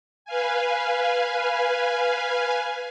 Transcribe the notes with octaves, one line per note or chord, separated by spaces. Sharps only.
B4 F5 G#5